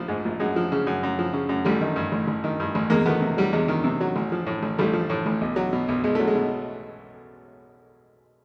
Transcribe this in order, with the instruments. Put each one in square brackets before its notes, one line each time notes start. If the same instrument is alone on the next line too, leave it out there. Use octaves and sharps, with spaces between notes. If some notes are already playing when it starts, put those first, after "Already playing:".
Already playing: [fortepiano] A#1 F3
G#2
A#1
F#2 G#3
F3
C#3
F#2
F#2
F3
C#3
F#2
A1 G3 A3
D#3
G2
A1
A1
D#3
G2
A1
E2 G#3 A#3
D#3 A3 B3
C3
F#3 G3
E2 G#3
D#3
C3
F#3
A1
F3
A2
A1
A1 G3 A3
F3
A2
A1
B1
F#3
B2
B1
B1 G#3
F#3 A3
G#3
B2